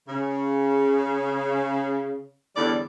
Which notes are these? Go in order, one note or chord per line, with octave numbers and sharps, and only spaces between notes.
C#3
E2 A2 D3 G3 D5